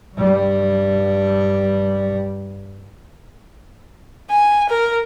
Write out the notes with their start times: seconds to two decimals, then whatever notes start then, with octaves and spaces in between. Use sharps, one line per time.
0.15 G2 G3
4.30 G#5
4.69 A#4